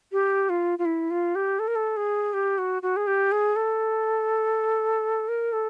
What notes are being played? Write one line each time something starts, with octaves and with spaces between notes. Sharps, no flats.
G4
F4
F4
E4
F4
G4
A4
A#4
A4
G#4
G4
F#4
F#4
G#4
G4
G#4
A4
A#4
A4